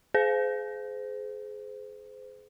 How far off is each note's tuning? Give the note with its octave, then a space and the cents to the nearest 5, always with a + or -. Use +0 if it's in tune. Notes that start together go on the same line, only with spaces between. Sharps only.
G#4 +25 C5 -30